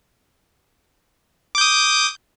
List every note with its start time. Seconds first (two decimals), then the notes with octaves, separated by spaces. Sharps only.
1.55 D6
1.58 G6
1.61 D#6